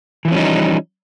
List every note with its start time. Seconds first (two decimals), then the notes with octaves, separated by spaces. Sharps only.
0.25 E3
0.28 F3
0.31 C#4
0.35 G3
0.38 D#4